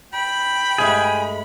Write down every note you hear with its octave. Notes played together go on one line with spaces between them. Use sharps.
G5 B5
G2 G#3 A3 G#4